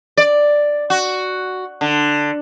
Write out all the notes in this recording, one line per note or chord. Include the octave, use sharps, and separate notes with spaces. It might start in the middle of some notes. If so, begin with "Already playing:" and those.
D5
F#4
D3